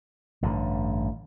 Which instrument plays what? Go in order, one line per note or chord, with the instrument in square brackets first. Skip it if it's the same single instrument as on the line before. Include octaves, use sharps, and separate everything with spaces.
[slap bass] A1 G2 D3